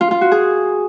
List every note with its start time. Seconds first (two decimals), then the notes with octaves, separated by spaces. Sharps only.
0.01 F4
0.11 F4
0.21 F#4
0.32 G#4